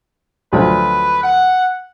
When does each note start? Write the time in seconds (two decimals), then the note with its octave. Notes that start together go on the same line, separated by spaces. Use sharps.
0.53 D2 F3 F#3 B4
1.23 F#5